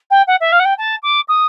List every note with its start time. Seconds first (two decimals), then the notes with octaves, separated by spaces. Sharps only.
0.10 G5
0.27 F#5
0.40 E5
0.52 F5
0.59 F#5
0.65 G5
0.78 A5
1.03 D6
1.28 D#6